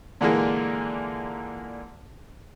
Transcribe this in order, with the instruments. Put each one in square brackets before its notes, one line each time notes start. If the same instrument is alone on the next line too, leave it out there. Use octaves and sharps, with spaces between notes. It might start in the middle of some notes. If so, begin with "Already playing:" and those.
[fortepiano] A#2 D3 E3 G#3 A#3 G#4